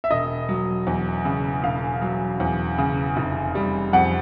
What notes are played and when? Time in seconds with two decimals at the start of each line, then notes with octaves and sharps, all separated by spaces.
0.04 E5
0.11 E1 D#5
0.49 F#3
0.87 E2
1.25 C#3
1.64 E1 F5
2.01 F#3
2.40 E2
2.78 C#3
3.17 F1
3.55 G3
3.93 F2 F#5